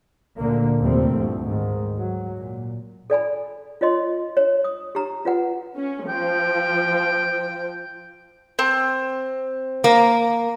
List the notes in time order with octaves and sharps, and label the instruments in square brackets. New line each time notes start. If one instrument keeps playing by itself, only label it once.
[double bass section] D2 A#2 D3 A#3
D#2 C3 F3 G3 A3 C4
D2 G2 F3
G#2 D#3
F#3
A#2
[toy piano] A4 D5 G#5 B5
F4 C#5 D#5 C6
C#5
D#6
G4 A#5
F4 B4 F#5
[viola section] C#4
[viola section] F3 [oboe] G5
[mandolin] C4
[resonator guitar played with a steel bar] A#3